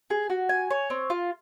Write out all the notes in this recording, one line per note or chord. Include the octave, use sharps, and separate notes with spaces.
G#4
F#4
G#5
C#5
C4
F4